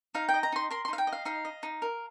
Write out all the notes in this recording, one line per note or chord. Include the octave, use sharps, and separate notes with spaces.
D#4 F5
G5
D#5
A#5
D#4 C6
A#4 C6
C6
D#4 F5
G5
D#5
F5
D#4 F5
D#5
D#4
A#4